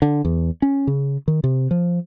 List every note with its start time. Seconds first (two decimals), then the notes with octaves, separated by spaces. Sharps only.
0.02 D3
0.25 E2
0.62 C#4
0.87 C#3
1.28 D#3
1.44 C3
1.71 F3